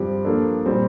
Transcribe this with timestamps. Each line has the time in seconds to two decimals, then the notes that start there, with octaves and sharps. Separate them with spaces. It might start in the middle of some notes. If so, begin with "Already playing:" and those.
Already playing: G2 F3 C4 G4
0.25 F3 A#3 D4 A4
0.66 A#2 G3 C4